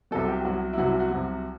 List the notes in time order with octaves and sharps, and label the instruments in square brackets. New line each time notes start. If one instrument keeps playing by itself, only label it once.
[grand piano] C2 C3 F#3 A4
G4
C2 C3 F#3 F#4
E4
C2 C3 F#3 F#4
E4
F#4
C2 C3 F#3